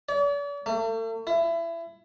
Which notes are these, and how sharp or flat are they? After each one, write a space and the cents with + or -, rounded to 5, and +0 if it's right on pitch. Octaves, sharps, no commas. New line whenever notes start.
D5 -45
A3 +40
E4 +25